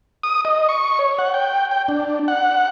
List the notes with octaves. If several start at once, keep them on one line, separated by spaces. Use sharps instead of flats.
D#6
D#5
C#6
C#5
F#5
G5
G5
D4
F#5